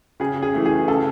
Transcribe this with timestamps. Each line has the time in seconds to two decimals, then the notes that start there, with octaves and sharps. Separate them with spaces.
0.20 C#3 G#4
0.43 G#4
0.54 E3 A3
0.66 G#4
0.88 C#3 A4